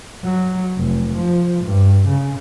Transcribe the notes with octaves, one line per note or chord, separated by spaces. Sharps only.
F#3
F1
F3
G2
C#3